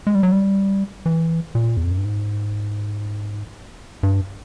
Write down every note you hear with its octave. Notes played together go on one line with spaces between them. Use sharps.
G#3
G3
F#3
G3
E3
A#2
E2
F2
F#2
G2
G#2
G2